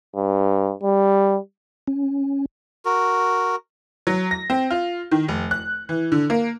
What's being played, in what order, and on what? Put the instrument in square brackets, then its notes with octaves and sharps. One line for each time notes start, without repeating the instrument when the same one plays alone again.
[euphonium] G2
G3
[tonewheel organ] C#4
[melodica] F#4 A#4
[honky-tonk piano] F#3
A#6
C4
F4
D#3
F1
F#6
E3
D3
A#3